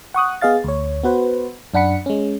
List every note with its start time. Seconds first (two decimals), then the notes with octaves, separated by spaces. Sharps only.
0.14 F#5 C#6 D#6 F#6
0.42 B3 G#4 D#5 F5 A6
0.64 D2 C#5
1.04 B3 F#4 B4 C5
1.74 F#2 D4 F#5 B5 C#7
2.06 G#3 C#4